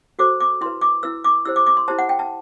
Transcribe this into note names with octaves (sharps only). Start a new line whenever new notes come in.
F#4 A4 C5 D6
D6
E4 B4 C6
D6
E4 B4 E6
D6
E4 G4 C5 E6
D6
D6
C6
E4 G4 C5 A5
F#5
G5
A5